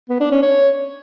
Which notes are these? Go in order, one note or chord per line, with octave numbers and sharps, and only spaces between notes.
B3
D4
C#4
C#5